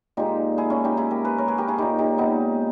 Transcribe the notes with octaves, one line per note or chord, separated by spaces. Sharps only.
A#2 G#3 D#4 G4
E4 G#4
C#4 E4
D#4 G4
E4 G#4
G4 A#4
G#4 B4
A#4 C#5
G#4 B4
G4 A#4
E4 G#4
A#2 G#3 D#4 G4
D#4 G4
B3 D#4